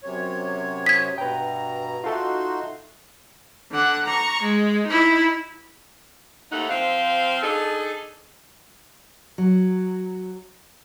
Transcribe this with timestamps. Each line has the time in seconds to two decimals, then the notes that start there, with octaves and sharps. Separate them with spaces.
0.04 F#2 C3 C#5
0.86 D#6 G#6 B6
1.18 G2 B2 B4 G5 A#5
2.04 D#4 F4 F#4 A4 E5 C6
3.72 D3 F#5
4.05 A#5 C#6
4.42 G#3
4.87 D#4 E4
6.51 D#2 A3 D#4 F#5
6.69 F3 C4 F5
7.43 D4 D#4 G#4 A4
9.38 F#3